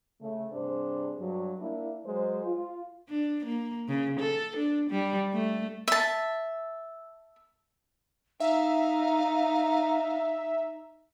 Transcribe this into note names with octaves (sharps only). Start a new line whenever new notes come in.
C#3 A3
G2 C3 D4 G#4 C5
G2 F#3
A#3 D4 E4
F#3 G#3 C5
F4
D4
A#3
C#3
A4
D4
G3
A3
E5 A5
D#4 E5 F5